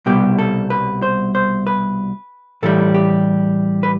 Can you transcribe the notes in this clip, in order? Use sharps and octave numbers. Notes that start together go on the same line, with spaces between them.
C2 B2 G3 G4
A4
B4
C5
C5
B4
A2 E3 G3 A4
G4
B4